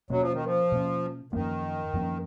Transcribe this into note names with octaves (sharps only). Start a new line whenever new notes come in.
B2 F#3 A#3 C#4
F3
D#3
F3
B2 A#3 C#4
F#2 D#3 F3 A#3 C#4
F#2 F3 A#3 C#4